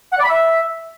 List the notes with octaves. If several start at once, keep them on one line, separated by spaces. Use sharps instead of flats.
F#5
D5
B5
E5